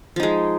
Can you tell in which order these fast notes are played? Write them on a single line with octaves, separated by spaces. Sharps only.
F3 D#4 G#3